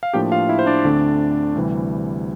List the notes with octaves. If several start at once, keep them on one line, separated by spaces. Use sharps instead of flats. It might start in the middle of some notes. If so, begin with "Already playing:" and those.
F5
A2 F3 A#3 D4 G4 G5
F4 F5
E4 E5
C5
D4 D5
D2 D3 A3 C4
D2 C3 E3 G3